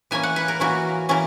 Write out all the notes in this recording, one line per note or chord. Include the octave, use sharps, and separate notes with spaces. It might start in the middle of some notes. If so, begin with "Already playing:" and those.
E3 A#3 C#4 G#5
F#5
B4
A#4
E3 A#3 C#4 F#4
E3 A#3 C#4